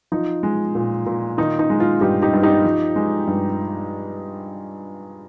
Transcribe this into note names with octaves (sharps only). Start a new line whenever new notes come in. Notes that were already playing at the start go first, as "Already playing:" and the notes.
F3 D#4
G#3
A#2
A#2
D#3 D#4
D#4
G#3
F4
G2 D#4 G4
D#4 G4
G2
D#4 G4
F3
G#3
G2